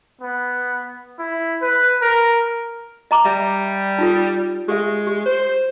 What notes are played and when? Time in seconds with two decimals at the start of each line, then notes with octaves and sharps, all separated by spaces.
0.21 B3
1.19 E4
1.62 B4
2.01 A#4
3.11 D#5 A#5 D6
3.25 G3 E5
3.98 D#4 F4 A4
4.68 G#3 G4 A4 E5
5.07 G4
5.26 C5